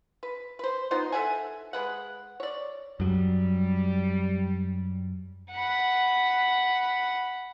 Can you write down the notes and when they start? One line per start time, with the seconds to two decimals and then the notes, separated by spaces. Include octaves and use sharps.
0.23 B4
0.59 B4 C5
0.91 B3 D#4 F4 C5
1.12 A4 E5 F#5 G#5
1.73 G#3 B4 F#5
2.40 C#5 D5
3.00 F#2 F#3 G3
5.53 F#5 B5